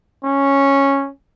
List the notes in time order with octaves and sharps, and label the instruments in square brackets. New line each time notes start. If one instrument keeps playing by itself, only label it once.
[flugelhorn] C#4